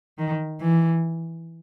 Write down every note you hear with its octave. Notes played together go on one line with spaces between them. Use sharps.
D#3
E3